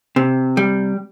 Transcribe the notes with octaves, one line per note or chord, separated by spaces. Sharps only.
C3
G3